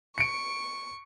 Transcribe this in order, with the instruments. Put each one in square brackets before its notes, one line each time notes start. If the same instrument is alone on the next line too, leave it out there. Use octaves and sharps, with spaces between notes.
[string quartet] C#6 [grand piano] C#7 D7